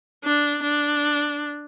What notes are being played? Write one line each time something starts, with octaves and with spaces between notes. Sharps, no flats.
D4
D4